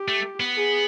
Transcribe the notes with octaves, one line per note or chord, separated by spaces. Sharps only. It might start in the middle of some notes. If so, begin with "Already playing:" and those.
Already playing: G4
A3
B3
G#4